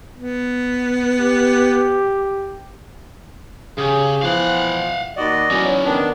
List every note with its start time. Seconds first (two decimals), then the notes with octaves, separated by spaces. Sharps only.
0.17 B3
1.20 G4
3.78 C#3 G4 G#4
4.22 E3 F3 B3 F5 F#5
5.17 D#2 F#4 D5 D#5
5.51 E3 F#3 C#4 D#4
5.84 D#3 B3 D4